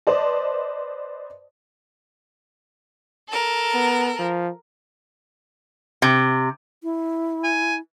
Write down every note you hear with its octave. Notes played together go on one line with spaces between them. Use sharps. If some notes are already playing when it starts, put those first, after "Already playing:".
B4 C5 D5 D#5 A5
A4 A#4
B3
F3
C3
E4
G#5